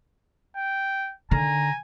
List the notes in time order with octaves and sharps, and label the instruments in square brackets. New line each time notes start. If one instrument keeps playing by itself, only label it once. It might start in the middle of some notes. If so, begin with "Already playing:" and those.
[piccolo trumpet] G5
[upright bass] D3 D#3 [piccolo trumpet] G#5 [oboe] A#5